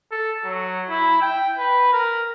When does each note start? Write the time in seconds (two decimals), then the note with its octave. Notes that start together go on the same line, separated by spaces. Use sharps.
0.12 A4
0.45 F#3
0.89 E4
1.21 G5
1.58 B4
1.93 A#4